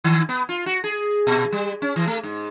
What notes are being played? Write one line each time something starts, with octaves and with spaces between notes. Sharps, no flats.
D#3
B3
F4
F#4
G#4
A#2
G3
C#4
E3
A3
G#2